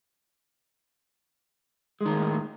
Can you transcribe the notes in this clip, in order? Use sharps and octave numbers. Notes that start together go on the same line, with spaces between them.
A2 D#3 G#3 A#3